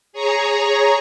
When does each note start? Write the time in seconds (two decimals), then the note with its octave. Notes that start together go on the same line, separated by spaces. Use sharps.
0.13 G#4 C#5 A#5